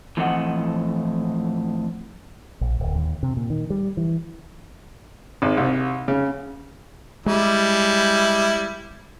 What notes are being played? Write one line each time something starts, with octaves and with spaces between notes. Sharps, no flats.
A2 E3 F3 C4 D#5 F#5
A#1
D1
D#2
C3
A#2
D#3
G3
E3
G#1
C2
C#3
G3 G#3 E4